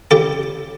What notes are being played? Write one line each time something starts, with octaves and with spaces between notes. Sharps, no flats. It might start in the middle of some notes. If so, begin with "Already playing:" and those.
C#3 G4 A4